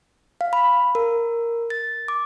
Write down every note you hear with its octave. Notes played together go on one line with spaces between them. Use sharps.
F5
B5
A#4
A6
D6